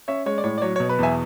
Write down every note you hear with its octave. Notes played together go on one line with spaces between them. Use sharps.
C#4 C#5 E5
G#3 C#5
D5
A2 C#5
D5
F#3 C#5
B2 C#5
B4
E2 E5 G#5